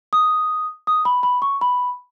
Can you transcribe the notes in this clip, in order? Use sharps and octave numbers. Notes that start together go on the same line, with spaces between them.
D#6
D#6
B5
B5
C#6
B5